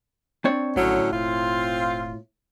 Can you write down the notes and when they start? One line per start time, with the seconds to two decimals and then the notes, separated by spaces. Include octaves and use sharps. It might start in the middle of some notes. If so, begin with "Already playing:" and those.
0.45 C4 D4 C#5
0.76 A#1 A2 D3 F#3 C#4
1.12 E1 C4 F4